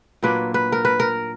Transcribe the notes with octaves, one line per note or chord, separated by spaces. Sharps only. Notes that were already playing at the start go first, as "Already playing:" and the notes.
A#2 F#3 A#3 D4 B4
B4
A#4
B4
A#4